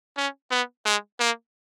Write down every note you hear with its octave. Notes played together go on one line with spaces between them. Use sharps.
C#4
B3
G#3
A#3